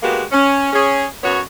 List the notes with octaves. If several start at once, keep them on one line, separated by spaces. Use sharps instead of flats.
G#3 A#3 B3 F#4 G4
C#4
C#4 G#4
F#2 B3 F#4 C#5